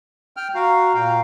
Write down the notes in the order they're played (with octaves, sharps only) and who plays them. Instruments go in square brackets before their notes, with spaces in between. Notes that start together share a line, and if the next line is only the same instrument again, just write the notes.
[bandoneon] G5 F6
[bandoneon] F#4 F5 [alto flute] A#5
[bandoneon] A#2 F5 G5